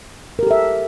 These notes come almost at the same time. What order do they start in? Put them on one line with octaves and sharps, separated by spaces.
A#4 G4 A4 E5